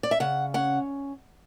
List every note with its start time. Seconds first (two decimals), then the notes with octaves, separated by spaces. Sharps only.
0.03 D5
0.11 E5
0.20 C#3 F#5
0.54 C#4 F#5